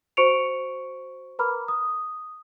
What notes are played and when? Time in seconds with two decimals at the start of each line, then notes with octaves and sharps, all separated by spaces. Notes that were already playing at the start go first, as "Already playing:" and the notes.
0.17 F#4 C5 C#6 C#7 D7 F7
1.39 A#4 B4 A#5 B5 D6 F6
1.68 D#6